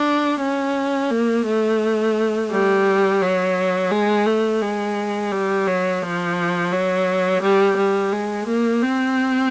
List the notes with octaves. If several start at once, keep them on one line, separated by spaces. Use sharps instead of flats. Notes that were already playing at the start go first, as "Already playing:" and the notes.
Already playing: D4
C#4
A#3
A3
G3
F#3
G#3
A3
G#3
G3
F#3
F3
F#3
G3
G3
G#3
A#3
C4